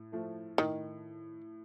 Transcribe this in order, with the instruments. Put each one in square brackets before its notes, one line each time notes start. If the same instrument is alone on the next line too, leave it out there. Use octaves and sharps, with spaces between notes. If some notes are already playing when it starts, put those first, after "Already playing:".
Already playing: [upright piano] A2
F3 A3
[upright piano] A2 [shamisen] D#3